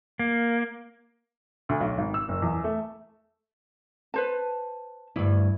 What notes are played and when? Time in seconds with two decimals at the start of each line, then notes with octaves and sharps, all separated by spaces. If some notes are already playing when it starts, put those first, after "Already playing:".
0.19 A#3
1.69 D2
1.81 B1
1.98 G#1
2.14 E6
2.29 F#1
2.42 E2
2.64 A3
4.14 B4 C5 A5
5.16 D2 G2 E4